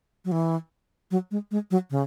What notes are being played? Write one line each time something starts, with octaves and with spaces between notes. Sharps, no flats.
F#3
E3
F#3
G#3
G#3
F#3
C#3